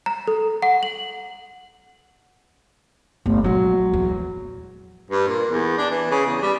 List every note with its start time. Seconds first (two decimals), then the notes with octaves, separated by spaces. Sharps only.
0.06 A#5
0.28 A4
0.62 F#5
0.83 F#7
3.26 G1 A3
3.44 A#1 F#3 G#3
3.93 E2
5.10 G2
5.28 A#2
5.48 E2
5.78 D4
5.91 E3
6.11 C#3
6.26 E2
6.42 G3